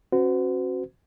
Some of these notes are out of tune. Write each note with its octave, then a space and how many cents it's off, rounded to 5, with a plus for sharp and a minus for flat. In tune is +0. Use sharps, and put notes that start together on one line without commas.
C#4 -40 F#4 +0 C5 -45